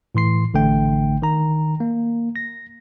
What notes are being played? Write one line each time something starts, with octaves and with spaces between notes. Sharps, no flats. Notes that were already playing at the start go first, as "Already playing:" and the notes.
A2 E3 C6 C7
A1 D3 A3 G5
D#3 A#5
A#3
A#6